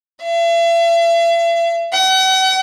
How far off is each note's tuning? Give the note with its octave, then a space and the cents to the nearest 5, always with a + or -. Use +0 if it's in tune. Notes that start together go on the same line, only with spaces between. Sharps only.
E5 +45
F#5 +40